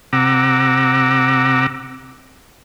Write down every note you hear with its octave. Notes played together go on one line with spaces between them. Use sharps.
C3 F#5 A#5 D6 E6